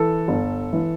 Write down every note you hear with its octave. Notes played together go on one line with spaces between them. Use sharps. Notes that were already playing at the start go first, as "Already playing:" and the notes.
Already playing: E3 A4
G1
E3